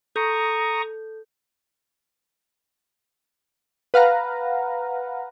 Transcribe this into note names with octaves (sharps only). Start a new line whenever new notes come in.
A4 A#5 C#6 D#6 G6
B4 F5 F#5 A#5